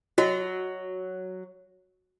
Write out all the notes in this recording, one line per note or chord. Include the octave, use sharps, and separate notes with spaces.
F#3 F#4 D#5